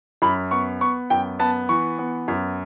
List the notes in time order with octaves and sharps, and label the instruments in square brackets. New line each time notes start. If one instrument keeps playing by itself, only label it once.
[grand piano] F#2 B5
B3 C#6
B3 C#6
F#2 G5
B3 A5
E3 C#6
B3
F#2